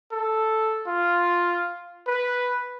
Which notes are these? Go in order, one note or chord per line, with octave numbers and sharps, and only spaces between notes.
A4
F4
B4